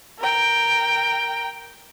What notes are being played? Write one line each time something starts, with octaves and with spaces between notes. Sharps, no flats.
A#4 G5